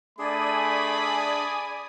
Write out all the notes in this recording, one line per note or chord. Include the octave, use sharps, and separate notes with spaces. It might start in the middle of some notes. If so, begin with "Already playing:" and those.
A3 D4 G#4 D5 G#5 B5 D#6